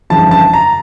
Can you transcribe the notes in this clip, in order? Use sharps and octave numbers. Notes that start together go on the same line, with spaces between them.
G1 F2 C#3 E3 A5
A5
A#5